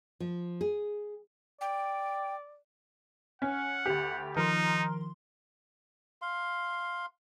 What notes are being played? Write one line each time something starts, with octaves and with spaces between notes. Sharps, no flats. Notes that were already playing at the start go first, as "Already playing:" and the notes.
F3
G#4
D5 G5
C#4 F#5
D2 G4
D#3 F3 D#4 A#4 C6
F5 C6